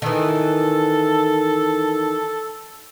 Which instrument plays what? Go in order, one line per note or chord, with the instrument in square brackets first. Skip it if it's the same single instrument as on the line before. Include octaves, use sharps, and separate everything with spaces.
[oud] D#3 E3 [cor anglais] A4